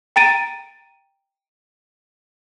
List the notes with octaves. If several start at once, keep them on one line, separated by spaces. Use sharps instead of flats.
G5 A#5 A6 D7 D#7